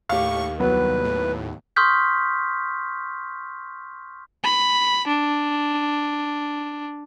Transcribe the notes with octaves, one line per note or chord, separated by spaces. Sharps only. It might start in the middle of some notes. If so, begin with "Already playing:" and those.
D#2 A2 G4 F5 C#6
C2 F#3 B3 B4
A2
C6 C#6 D#6 F6 G6 B6
B5
D4